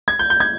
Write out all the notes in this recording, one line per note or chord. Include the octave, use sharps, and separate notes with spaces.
G#6
G6
G6
G#6